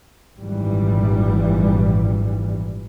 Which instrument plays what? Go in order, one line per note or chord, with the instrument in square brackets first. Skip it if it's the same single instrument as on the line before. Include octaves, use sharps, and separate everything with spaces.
[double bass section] G#1 F#2 A#2 E3 G3